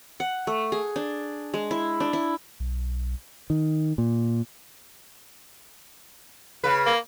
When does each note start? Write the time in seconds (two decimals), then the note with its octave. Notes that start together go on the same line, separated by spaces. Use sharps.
0.20 F#5
0.47 A3
0.72 G#4
0.96 D4
1.54 G#3
1.71 E4
2.00 D4
2.13 E4
2.60 B1
3.50 D#3
3.98 A#2
6.64 C#3 B4
6.86 A#3